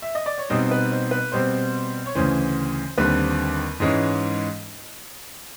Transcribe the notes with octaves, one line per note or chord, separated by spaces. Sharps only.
E5
D#5
D5
C#5
B2 G3 C4 D#4 C5
B4
C5
B4
B2 G3 C4 C5
C#5
D2 C#3 E3 C5
D#2 D3 G3 C4 B4
G#2 E3 G#3 C#4